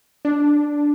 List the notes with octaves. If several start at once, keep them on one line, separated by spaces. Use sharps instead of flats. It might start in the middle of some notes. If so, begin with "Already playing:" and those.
D4